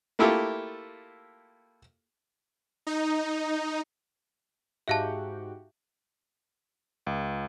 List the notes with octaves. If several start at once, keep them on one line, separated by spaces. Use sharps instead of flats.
A3 A#3 E4 F4 G4 A4
D#4
G#2 F#4 G4 E5 F5 A5
C#2